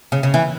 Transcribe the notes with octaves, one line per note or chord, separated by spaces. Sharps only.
C#3
C#3
E3